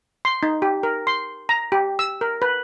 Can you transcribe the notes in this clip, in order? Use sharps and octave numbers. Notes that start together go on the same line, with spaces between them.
C6
D#4
G4
A#4
C6
A#5
G4
E6
A#4
B4